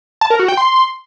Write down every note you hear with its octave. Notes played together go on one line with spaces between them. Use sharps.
A5
A#4
F#4
G5
C6